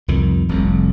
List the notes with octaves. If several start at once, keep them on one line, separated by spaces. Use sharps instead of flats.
C2 F2 D#3
F1 C2 F2